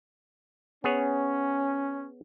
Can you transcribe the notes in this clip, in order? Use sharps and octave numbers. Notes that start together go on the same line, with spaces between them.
B3 C#4 G#4 C#5